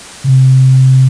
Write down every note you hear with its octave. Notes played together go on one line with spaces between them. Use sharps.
C3